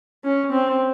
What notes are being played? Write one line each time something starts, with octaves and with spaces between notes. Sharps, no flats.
C#4
C4